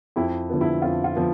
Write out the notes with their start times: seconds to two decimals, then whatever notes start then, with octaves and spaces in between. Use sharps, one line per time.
0.16 F2 E4
0.49 D3 F3 B3
0.61 E4
0.82 F2 F4
1.04 F4
1.16 D3 F3 B3